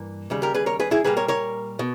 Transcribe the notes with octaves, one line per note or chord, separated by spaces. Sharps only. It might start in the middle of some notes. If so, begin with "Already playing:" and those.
Already playing: G2 E3 A#3
D#2 C#3 G3
G4 A#4
G#4 B4
A#4 C#5
G#4 B4
E4 G#4
A#2 G3 A#3 G#4 B4
A#4 C#5
A#4 C#5
B2